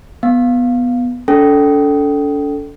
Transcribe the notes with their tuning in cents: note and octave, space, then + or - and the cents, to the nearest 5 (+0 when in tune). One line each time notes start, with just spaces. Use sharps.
B3 +0 F5 +0
D4 -45 A4 +0 G5 -25